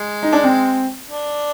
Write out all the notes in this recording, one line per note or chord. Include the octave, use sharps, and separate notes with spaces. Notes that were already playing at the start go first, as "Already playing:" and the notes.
Already playing: G#3
D#4
D4
C4
D4